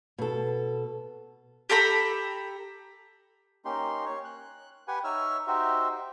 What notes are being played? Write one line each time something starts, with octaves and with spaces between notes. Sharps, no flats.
B2 A4
G4 A4 A#5 B5
A#3 C#4 D#4 G4 C6
C#5
F#6
G4 B4 F#5 G#5
D#4 C#5 E5 E6 F6
D#4 F#4 G4 C5 E5